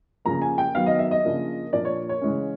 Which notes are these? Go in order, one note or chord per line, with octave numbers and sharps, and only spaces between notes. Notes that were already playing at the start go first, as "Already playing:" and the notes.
C#3 F3 A#3 A#5
G#5
G5
D#3 F#3 B3 F5
D#5
E5
D#5
C#3 F3 A#3 D4
A#2 F3 A#3 D4 D5
C#5
C#5
C#3 E3 G#3 C#4